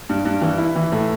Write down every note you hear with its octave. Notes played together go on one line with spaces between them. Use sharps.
G2
G2
E3
E4
E3
A2